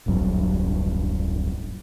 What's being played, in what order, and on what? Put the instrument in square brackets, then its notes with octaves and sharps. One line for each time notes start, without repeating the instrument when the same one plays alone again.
[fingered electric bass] D1 A#1 G2 F#3